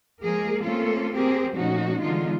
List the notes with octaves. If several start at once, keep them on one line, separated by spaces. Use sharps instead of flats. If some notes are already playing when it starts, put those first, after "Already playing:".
F3 G#3 A#3 G#4 A#4
A3 A#3 C4 C#4 F4 A4
C4 G4 G#4 A#4
A#2 F3 A3 C#4 D#4 F#4
D3 E3 G#3 B3 D#4 F4